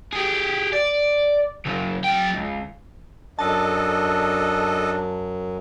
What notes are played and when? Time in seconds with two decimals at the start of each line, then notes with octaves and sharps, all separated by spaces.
0.13 G4 G#4
0.73 D5
1.66 C#3 F#3
2.04 F#3 G5
2.34 C#2
3.39 F#2 D4 A4 D#5 A5